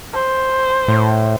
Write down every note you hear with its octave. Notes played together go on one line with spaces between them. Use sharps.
C5
A2